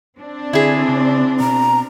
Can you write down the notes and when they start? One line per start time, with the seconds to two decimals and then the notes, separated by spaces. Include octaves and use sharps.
0.18 C4 D4
0.53 D3 E4 G#4
0.89 C#3
1.40 B2 A#5